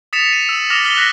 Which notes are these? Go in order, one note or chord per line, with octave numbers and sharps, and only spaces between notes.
D#6 A6 B6 C#7 E7 F7
D#7
E6 F#7
D6 D#6 F6 A#6 E7
D6 F6 B6 F#7 G7
F#6 A#6 B6